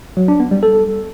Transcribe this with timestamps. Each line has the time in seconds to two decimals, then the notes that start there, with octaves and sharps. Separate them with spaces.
0.17 F#3
0.28 D4
0.40 B3
0.51 G3
0.63 A4